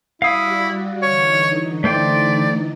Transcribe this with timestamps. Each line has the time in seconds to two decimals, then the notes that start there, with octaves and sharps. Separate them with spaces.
0.22 G3 E4 F#4 D5 F5 D#6
1.02 D3 E3 D#4 C#5
1.84 A3 C5 D5 G5